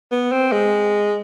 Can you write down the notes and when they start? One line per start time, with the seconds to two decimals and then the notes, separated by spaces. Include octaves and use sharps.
0.12 B3
0.32 C4
0.52 G#3